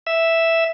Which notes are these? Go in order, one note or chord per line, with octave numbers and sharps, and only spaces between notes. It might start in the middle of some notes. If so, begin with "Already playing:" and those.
E5